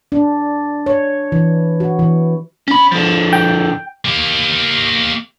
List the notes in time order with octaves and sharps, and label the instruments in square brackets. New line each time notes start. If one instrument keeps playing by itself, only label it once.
[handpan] D4
C#5
E3
F#4
E3
[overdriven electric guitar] C#4 B5
D3 F3
[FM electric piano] G5
[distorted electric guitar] A#3 G4